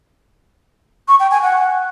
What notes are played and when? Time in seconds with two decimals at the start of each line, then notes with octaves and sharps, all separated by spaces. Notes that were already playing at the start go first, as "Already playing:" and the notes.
1.08 C#6
1.20 G5
1.31 G#5
1.43 F#5